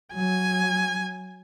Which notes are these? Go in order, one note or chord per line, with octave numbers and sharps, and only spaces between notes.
F#3 G#5